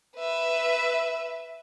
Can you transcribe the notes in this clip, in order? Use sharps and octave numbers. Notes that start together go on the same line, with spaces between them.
B4 E5